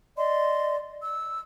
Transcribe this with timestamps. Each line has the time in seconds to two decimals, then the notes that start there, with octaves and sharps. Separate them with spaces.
0.16 D5 D#5 C6
1.02 E6